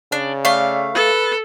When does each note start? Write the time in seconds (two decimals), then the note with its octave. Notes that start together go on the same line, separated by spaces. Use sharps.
0.12 C#3 D4
0.45 A3 D5 F5
0.94 A4 B4